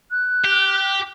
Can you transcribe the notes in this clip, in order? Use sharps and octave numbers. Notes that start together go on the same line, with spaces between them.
F#6
G4